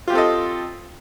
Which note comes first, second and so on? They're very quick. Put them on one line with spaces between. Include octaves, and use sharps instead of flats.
F4 G4 C4 A4 D#5